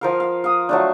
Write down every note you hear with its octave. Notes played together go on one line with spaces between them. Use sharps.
F3 A#4 F5
F5
F5 D#6
F#3 A3 D4